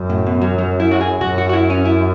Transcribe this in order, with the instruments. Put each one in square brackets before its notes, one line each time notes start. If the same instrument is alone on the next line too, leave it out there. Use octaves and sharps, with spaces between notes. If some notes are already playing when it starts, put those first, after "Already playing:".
Already playing: [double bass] F#2
[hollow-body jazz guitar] A2
B2
F#3
F#3
E4
F#4
G#4
[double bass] F#2 [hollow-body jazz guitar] F#4
[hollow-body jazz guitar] F#4
F#4
E4
C#4
E4